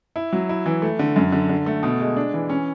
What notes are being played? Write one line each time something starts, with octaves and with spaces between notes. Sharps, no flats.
E4
F#3
E4
E3
A3
D3
F#2
D3
D3
A3
B2
G#3
D4
E3
C#4